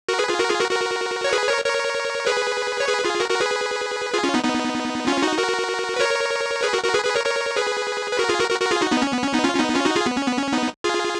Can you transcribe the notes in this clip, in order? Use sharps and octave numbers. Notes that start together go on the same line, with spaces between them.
F#4 A#4
G#4 B4
F4 G#4
F#4 A#4
F4 G#4
F#4 A#4
F#4 A#4
C#5
G#4 B4
A#4 C#5
A#4 C#5
G#4 B4
C#5
G#4 B4
F4 G#4
F#4 A#4
F#4 A#4
G#4 B4
F4 G#4
C#4 F4
B3 D#4
B3 D#4
C#4 F4
D#4 F#4
F#4 A#4
B4
A#4 C#5
G#4 B4
F#4 A#4
F#4 A#4
G#4 B4
G#4 B4
A#4 C#5
A#4 C#5
G#4 B4
B4
F#4 A#4
F4 G#4
F#4 A#4
F#4 A#4
F#4 A#4
F4 G#4
D#4 F#4
B3 D#4
C#4
B3
C#4
B3 D#4
C#4 F4
C#4
B3 D#4
C#4 F4
D#4 F#4
F4 G#4
B3
C#4
B3
C#4
B3 D#4
F4 G#4